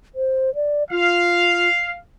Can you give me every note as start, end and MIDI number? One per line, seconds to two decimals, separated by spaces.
0.15 0.54 72
0.55 0.84 74
0.91 1.69 65
0.91 1.97 77